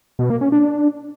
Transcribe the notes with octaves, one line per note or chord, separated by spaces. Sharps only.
B2
A#3
C#4
D4